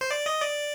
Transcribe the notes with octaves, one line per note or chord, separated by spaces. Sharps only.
C5
D5
D#5
D5